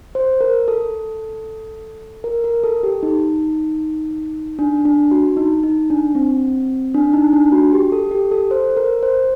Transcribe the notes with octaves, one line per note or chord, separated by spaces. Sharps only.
C5
A#4
A4
A#4
A#4
A4
G4
D#4
D4
D4
F#4
D#4
D#4
D4
C4
D4
D#4
D4
F#4
G4
A4
G4
A4
C5
A#4
C5